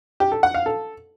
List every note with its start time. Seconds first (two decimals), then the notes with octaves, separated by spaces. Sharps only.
0.20 G4
0.32 A4
0.43 F#5
0.54 F5
0.66 A4